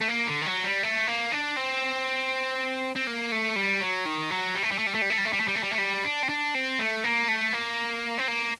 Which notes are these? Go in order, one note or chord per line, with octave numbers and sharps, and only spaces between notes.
A3
A#3
D3
D#3
F#3
G3
A3
A#3
D4
C4
C4
A#3
A3
G3
F#3
D#3
F#3
G3
A3
G3
A3
G3
A3
G3
A3
G3
A3
G3
A3
G3
A3
G3
A3
G3
D4
C4
D4
C4
A3
A#3
A3
A#3
C4
A#3